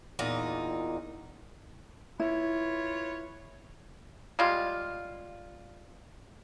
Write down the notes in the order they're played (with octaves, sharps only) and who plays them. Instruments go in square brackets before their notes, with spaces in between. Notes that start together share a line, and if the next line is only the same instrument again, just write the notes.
[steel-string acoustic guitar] E2 A#2 D#4
[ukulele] E4 [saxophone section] F4 B4 C#5
[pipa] G3 G#3 F4